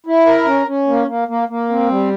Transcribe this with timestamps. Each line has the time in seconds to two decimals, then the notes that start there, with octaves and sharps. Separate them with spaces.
0.06 E4
0.26 A#4
0.46 C#4
0.67 C#4
0.88 A#3
1.08 A#3
1.28 A#3
1.48 A#3
1.69 C4
1.89 G3